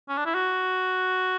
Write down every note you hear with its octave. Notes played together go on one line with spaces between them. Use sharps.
C#4
D4
E4
F#4